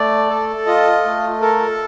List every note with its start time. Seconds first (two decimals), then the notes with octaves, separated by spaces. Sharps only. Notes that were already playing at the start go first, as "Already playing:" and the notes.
Already playing: A3 D5
0.30 A4
0.66 F4 D#5
1.05 A3
1.41 A4 A#4